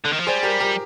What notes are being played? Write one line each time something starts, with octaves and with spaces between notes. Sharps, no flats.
D3
D#3
F3
G3 G#4 C5
G4 A#4
G4 A#4